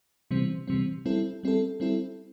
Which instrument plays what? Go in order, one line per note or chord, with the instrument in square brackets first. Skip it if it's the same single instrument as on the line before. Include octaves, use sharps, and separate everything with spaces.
[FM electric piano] C3 E3 G3 C4
C3 E3 G3 C4
G3 C4 E4 A4
G3 C4 E4 A4
G3 C4 E4 A4